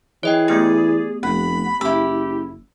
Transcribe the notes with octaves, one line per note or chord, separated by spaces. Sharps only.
E3 G#4 C#5 D#5 G5
A3 B3 G4 D5
F1 F#5 B5
F#1 E4 G4 B5 E6